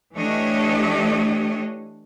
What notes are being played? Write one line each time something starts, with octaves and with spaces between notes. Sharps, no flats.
E3 A3 D4 G4 C#5 D#5